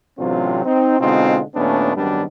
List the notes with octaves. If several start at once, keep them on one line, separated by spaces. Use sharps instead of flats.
A1 C3 F#3 C4 D4 F4
C4 D#4
B2 D3 G#3 C4 D#4 F4
D#2 A#2 A3 B3 C#4 D4
G#1 F#2 D#3 G3 B3 D4